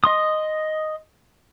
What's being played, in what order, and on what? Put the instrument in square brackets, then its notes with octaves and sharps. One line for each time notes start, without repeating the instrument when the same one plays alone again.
[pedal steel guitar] D#5 C6 D#6